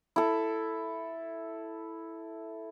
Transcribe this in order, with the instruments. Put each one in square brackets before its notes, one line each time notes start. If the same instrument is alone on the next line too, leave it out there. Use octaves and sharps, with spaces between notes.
[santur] E4 A4